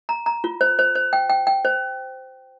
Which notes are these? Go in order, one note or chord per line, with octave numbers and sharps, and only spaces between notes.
A#5
A#5
F4
C5
C5
C5
G5
G5
G5
C5